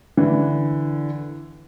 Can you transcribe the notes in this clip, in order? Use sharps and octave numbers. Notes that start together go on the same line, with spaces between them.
D3 E3